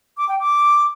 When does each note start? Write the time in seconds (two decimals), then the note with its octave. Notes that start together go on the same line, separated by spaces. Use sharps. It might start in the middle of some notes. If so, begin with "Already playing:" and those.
0.18 D6
0.29 G5
0.40 D6